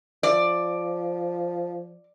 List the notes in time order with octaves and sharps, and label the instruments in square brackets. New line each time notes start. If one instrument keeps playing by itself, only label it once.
[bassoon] F3 [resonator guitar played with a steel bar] D5